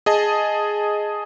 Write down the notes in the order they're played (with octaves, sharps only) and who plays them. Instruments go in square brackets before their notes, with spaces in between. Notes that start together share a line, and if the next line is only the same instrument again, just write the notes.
[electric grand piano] G#4 D#5 A5